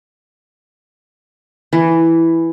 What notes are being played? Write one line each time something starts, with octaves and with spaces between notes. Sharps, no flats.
E3